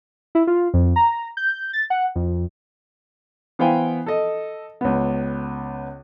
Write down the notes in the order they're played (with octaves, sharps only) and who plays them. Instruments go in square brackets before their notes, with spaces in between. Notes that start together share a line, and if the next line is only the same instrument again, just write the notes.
[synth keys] E4
F4
F2
A#5
G6
A6
F#5
F2
[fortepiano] E3 B3 C5 F5 G5 G#5
A4 D#5
C#2 B3